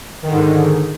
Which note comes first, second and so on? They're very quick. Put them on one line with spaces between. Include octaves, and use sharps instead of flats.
D#3 D3 G#2